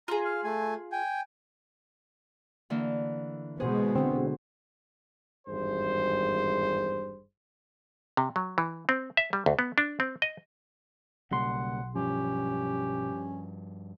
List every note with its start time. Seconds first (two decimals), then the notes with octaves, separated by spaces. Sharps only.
0.08 F4 G#4 A#5
0.25 F5
0.44 A3 G#5
0.92 G5 G#5
2.70 D3 E3 A#3
3.60 B2 G#3 B3 G#4 C5
3.96 D3 C4 F#4
5.48 G#1 E2 G2 G#4 C5
8.17 C3
8.36 F#3
8.58 E3
8.89 C4
9.17 E5
9.33 G3
9.46 D2
9.59 B3
9.78 D4
10.00 C4
10.22 D#5
11.31 B1 C#3 G3 A#3 F#5 C6
11.95 G2 F3 C#4 G4